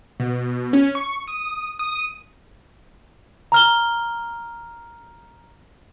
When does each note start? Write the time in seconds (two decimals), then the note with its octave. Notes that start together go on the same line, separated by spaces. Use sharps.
0.20 B2
0.73 C#4
0.95 C#6
1.28 D#6
1.79 D#6
3.52 A#5 F6 G7